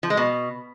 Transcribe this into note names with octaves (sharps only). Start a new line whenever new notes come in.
F3
G#3
B2